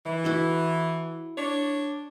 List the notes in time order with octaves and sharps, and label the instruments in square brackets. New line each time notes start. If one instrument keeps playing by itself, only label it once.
[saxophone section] E3
[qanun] E4 F#4 A4
[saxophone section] D4 C#5